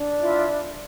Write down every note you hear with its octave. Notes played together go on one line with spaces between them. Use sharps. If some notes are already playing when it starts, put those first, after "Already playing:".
Already playing: D4
E4 F4 E5